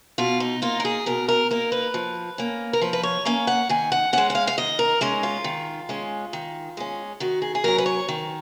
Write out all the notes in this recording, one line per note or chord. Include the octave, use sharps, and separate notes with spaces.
B2 F4
D#4
A#3 D#4 F4
A#4
G#4
B2 A#4
A#4
A#3 D#4 A#4
B4
F3
A#3 C#4
A#4
F3 B4
B4
C#5
A#3 C#4 F5
F#5
D#3 G#5
F#5
G#3 C#4 F#5
F#5
F5
F5
D#3 D#5
A#4
G#3 C#4 D#4
F4
D#3
G#3 C#4
D#3
G#3 C#4
D#3 F#4
G#4
G#4
F#3 C#4 A#4
B4
C#5
D#3